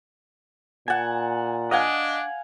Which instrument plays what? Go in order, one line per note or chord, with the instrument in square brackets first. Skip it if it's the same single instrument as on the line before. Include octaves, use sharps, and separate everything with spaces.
[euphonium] A#2 [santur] F#5 A5 [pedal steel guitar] G#5
[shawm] D4 [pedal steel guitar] D#5 [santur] F5 F#5 G#5